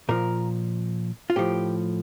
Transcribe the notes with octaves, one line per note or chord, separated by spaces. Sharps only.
A#2 F3 A#4
F4
A2 F3 G4